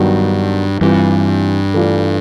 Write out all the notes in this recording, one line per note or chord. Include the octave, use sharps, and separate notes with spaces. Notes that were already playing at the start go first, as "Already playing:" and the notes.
Already playing: G2 D#3 F#3 B3 D4 F#4
G2 E3 G3 C4 F4
E3 A3 D4 F4